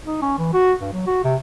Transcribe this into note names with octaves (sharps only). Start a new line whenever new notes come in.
D#4
C#4
E3
F#4
G2
F#3
F#4
C3